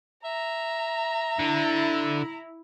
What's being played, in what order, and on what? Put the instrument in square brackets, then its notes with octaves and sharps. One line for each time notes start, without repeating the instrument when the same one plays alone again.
[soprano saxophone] E5 [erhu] A#5
[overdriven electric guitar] D3 [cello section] E4